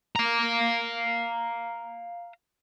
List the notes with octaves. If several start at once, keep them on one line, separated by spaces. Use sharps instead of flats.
F5 A#5